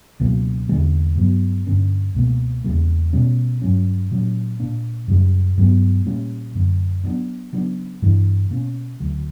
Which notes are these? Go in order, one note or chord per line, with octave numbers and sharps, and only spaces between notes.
C#2 B2 F#3 A#3
E2 D3 G3 A#3
G2 F#3 B3
G2 D3 A#3 C#4
C#2 B2 A#3
E2 C#3 G3 A#3
B2 G3 C#4
G2 F#3 C#4
A#2 F#3 C#4
A#2 A#3 D4
F#2 C#3 G3
G2 F#3 B3
A#2 G3 A#3 C#4
F#2 D3 A#3
G2 F#3 B3 D4
C#3 F#3 B3 D4
G2 E3 A#3 D4
B2 A#3 C#4
D2 C#3 F#3